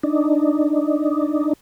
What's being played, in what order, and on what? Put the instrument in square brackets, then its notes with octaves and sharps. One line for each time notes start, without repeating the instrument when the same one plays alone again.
[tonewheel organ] D4 D#4